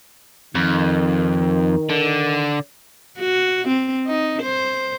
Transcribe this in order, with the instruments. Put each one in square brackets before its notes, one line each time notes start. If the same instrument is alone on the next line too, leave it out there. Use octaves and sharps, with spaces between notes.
[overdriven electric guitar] F2 [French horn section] D#3
[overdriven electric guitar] D3
[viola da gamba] F#4
C4
D#4
C5